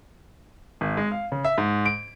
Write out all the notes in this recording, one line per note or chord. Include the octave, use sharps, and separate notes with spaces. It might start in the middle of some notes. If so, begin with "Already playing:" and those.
G#1
G#3
F5
C#3
E5
G#2
D7